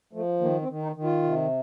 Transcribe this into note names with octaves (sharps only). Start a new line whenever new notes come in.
F3 A3
D#3 A#3
C4
D#3
D#4
D#3
F4
C3